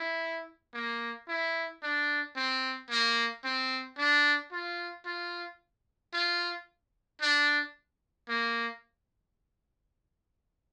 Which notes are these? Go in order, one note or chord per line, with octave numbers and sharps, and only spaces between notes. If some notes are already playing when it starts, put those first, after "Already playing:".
Already playing: E4
A#3
E4
D4
C4
A#3
C4
D4
F4
F4
F4
D4
A#3